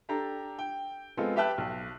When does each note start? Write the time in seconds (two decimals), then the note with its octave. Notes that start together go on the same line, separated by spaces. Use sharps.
0.09 D4 G4 A4 A#5
0.59 G5
1.17 G#3 B3 C4 F4 A4
1.36 G4 B4 E5 G5 A5 F#6
1.58 B1